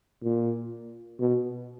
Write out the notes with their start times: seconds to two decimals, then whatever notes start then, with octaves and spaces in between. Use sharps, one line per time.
0.23 A#2
1.20 B2